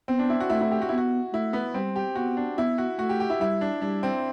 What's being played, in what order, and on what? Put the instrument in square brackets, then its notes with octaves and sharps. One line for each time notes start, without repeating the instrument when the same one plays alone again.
[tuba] B3 [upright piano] C4
[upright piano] D4
E4
F#4
[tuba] A3 [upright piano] E4
[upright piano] E4
G4
F#4
E4
[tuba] B3
[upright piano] F#4
[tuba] A3 [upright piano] E4
[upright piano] B3
[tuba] G3 [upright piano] C4
[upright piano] G4
[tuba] B3 [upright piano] F#4
[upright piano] D4
[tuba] B3 [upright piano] E4
[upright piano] F#4
[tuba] A3 [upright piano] F#4
[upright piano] G4
G4
E4
[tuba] G3 [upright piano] E4
[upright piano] D4
[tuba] G3 [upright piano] D4
[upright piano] C4